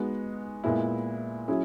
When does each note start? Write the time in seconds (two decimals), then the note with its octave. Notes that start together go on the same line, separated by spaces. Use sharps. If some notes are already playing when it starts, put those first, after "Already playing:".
Already playing: G#3 B3 D#4 F#4
0.64 A#2 G#3 B3 E4
1.48 F#3 C#4 E4 G#4